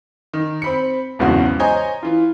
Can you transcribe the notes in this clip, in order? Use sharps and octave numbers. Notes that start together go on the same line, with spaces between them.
D#3
C4 B5 C#7
B1 E2 G#2 C#3 F#4
C5 C#5 D#5 G#5 A#5
E3 F4